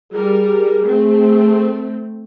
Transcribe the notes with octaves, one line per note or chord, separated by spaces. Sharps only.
G3 G#4 A#4
A3 C4